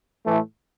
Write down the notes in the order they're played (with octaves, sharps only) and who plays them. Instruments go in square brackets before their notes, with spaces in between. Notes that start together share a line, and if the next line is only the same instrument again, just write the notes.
[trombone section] A2 E3 A3